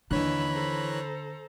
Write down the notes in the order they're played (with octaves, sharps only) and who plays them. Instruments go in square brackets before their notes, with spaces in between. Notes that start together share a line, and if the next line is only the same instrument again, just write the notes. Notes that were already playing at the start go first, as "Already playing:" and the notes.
[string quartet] D#2 D#4 E6 [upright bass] D3 [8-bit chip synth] E3 C#5 F#6 [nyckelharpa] B5
[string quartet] A4 C5 A#5